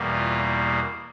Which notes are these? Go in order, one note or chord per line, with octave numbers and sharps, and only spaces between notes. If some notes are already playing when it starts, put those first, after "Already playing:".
Already playing: E2 B2 G3 A#3
F4